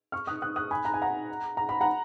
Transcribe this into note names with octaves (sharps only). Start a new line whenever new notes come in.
C#6 F6
D#6 F#6
D#6 F#6
D#6 F#6
G#5 B5
A#5
G#5
F#5 A#5
A#5
B5
F#5 A#5